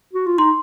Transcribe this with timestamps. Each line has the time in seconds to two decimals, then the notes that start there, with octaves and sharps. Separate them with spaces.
0.13 F#4
0.26 F4
0.38 D#4 C6